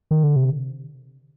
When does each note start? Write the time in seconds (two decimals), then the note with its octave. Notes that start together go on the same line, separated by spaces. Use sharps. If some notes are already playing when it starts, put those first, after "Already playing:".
0.11 D#3
0.24 D3
0.36 C3